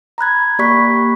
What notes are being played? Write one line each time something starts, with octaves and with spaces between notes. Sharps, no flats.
A#5 B5 F#6 G#6
A#3 G4 D5 B5 C#6 B6